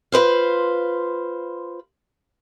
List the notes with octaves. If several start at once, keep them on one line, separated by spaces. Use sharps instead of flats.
F4 B4 C5 F5